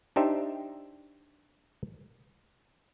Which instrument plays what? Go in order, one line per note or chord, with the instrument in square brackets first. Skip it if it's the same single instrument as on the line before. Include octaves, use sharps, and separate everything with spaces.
[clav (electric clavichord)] D4 D#4 G4 C5 E5